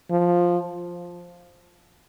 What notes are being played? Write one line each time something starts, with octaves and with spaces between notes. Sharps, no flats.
F3